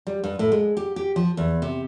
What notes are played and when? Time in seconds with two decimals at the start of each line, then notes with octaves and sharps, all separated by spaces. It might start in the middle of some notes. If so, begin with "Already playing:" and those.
0.07 G3
0.24 G2
0.39 A2
0.52 G#3
0.77 G4
0.96 G4
1.16 F3
1.37 E2
1.62 C3